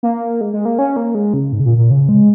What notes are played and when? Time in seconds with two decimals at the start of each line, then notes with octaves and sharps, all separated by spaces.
0.03 A#3
0.41 G#3
0.53 G#3
0.65 A#3
0.79 C#4
0.96 A#3
1.15 G#3
1.34 C#3
1.53 G#2
1.60 C#3
1.66 A#2
1.78 A#2
1.91 C#3
2.09 G#3